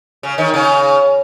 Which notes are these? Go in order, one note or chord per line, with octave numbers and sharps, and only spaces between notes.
C#3
D#3
C#3